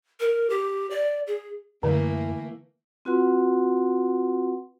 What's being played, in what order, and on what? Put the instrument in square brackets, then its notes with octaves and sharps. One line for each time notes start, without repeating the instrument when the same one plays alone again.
[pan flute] A#4
G4
D5
G#4
[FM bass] F#2 [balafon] D3 [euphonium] E3 [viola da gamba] A3 A#3
[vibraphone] C4 F4 F#4 B4 F#5 C6